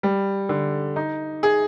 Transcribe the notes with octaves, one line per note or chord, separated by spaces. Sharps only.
G3
D3
D#4
G#4